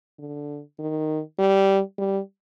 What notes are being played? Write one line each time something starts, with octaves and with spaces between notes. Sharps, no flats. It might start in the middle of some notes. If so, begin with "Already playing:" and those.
D3
D#3
G3
G3